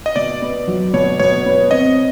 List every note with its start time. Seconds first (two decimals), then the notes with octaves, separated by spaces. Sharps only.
0.06 D#5
0.16 B2 D5
0.42 B3
0.67 F#3
0.93 B2 C#5
1.19 B2 C#5
1.46 B3
1.71 C4 D#5